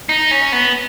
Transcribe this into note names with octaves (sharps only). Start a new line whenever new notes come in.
D#4
C#4
B3